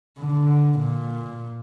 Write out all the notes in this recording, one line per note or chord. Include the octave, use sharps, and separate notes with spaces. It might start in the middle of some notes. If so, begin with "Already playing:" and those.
D3
A#2